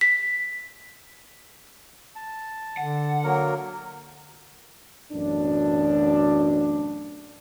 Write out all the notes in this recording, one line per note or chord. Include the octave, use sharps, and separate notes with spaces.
B6
A5
D3 F#5
F#3 A#3 A#4
A1 F#2 B2 D4